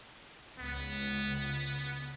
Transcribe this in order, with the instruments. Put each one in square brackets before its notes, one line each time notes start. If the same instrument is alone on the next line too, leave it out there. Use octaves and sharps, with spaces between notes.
[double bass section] C#2 [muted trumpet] B3